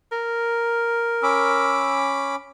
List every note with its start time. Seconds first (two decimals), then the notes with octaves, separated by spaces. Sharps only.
0.12 A#4
1.23 C#4 B5 D6 E6